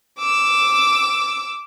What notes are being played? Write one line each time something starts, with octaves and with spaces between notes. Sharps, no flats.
D6 E6